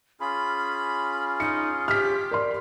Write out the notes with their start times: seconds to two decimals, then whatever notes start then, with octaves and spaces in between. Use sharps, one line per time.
0.20 C#4 F4 G#4 B5
1.40 D#4 C#7
1.88 G4 F6 B6
2.31 A#4 D5 C6